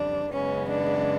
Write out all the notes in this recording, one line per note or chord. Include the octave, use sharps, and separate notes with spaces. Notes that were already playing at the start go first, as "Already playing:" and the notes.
Already playing: F2 C#3 E3 G3 D4
F#2 C#3 E3 G#3 B3 C#4
D4